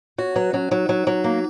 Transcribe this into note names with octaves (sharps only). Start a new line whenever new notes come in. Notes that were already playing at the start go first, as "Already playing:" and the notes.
F#4 C#5
F#3 B4
F#3 C#4
F#3 D#4
F#3
F#3
A#3